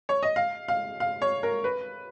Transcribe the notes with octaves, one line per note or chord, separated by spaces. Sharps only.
C#5
D#5
F5
F5
F5
C#5
A#4
B4